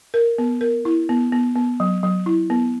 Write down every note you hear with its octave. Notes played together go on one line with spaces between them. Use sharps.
A#4
B3
A#4
E4
B3
B3
B3
F#3
F#3
E4
B3